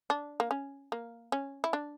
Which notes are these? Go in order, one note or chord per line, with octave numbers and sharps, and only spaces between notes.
D4
A#3
C#4
A#3
C#4
E4
D4